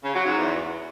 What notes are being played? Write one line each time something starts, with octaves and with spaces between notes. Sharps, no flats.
C#3
F#3
G#2
E2